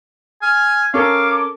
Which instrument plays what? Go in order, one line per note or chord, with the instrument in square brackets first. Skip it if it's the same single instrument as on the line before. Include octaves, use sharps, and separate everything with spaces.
[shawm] G#5 [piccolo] F6
[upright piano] C#4 A4 A#4 [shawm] F5 [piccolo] D6